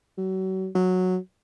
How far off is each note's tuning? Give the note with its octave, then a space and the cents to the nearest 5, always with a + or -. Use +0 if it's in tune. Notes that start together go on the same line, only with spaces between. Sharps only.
F#3 +35
F#3 -10